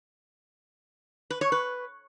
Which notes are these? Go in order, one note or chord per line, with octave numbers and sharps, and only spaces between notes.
B4
C#5
B4